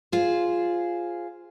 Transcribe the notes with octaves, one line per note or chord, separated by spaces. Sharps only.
F4 G#4 C5